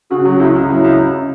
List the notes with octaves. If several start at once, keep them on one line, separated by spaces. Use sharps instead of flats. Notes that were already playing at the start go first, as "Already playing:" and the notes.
C#3 F#4
F#3 F#4
C#2 E4
C#2
F#3 E4
C#2
C#2